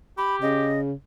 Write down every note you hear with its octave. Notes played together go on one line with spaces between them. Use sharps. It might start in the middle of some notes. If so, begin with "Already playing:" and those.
G4 B5
C#3 D#5